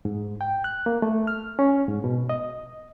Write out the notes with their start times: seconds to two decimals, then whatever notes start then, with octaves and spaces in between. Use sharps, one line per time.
0.05 G#2
0.41 G5
0.64 F#6
0.86 A#3
1.02 A3
1.27 F6
1.59 C#4
1.89 G#2
2.04 B2
2.29 D#5